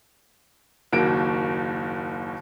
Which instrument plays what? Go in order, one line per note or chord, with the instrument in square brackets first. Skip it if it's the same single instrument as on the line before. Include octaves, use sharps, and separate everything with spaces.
[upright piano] F#1 D#2 A#3 F#4 D7